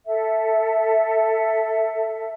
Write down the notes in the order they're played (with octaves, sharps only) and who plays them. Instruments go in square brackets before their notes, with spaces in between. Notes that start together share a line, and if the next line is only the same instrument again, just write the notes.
[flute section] A4 E5